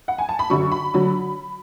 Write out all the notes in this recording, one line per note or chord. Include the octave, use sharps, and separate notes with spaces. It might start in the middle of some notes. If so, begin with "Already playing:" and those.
F#5
G#5
A5
B5
F#2 D3 F#3 C#6
B5
D3 F#3